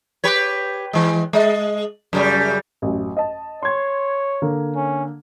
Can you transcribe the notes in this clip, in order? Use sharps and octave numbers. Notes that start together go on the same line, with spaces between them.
G4 B4 C#5
E3 G#3
G#3 D#5
F#2 C#3 G3
A1 F#2
D#5 A5
C#5 C6 G#6
D3 A#3
C#4